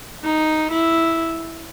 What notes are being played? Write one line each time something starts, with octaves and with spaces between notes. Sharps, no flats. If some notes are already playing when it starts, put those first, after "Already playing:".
D#4
E4